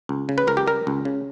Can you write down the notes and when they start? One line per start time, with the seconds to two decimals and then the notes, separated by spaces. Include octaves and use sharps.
0.09 C#2
0.29 C#3
0.38 B4
0.47 C#2 A#4
0.57 G4
0.67 G3 A#4
0.87 C#2
1.05 C#3